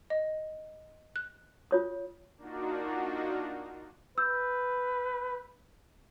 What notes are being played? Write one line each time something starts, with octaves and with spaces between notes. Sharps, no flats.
D#5
F#6
F4 C#5 D#6
A#3 D4 D#4 F4 F#4
B4 E6 G6